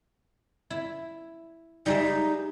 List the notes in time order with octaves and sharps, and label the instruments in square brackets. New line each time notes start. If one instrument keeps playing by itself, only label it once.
[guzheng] E4
[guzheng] G3 G#3 E5 [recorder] D#4